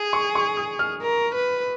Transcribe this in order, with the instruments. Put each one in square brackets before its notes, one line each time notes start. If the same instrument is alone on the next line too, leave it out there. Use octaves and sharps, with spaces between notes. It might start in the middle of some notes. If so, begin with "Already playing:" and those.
Already playing: [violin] G#4
[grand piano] C#6
C#6
D#6
F6
[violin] A#4
B4